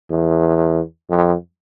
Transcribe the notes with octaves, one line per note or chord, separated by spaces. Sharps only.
E2
F2